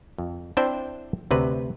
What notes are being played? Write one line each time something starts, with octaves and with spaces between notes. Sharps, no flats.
F2
C4 D4 E4 C5 E5 G5
D2 C3 B4